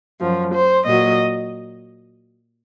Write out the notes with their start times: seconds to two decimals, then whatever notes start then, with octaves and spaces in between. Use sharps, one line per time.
0.22 F#2 F3
0.53 C5
0.86 A#2 F#3 D#5